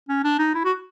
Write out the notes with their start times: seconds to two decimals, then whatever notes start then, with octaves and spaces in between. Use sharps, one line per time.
0.09 C#4
0.24 D4
0.39 D#4
0.54 E4
0.64 F#4